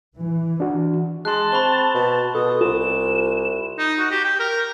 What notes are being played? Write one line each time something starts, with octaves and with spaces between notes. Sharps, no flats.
E3
D4 F#4
G#3 A5 C6 F#6
C4 B5 C#6 G7
B2
B2 A4 D#6
C2 F4 E7
D#4
F#4
G4
G5
A#4